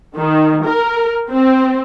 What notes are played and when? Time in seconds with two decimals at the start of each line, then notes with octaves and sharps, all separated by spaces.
0.17 D#3
0.64 A#4
1.29 C4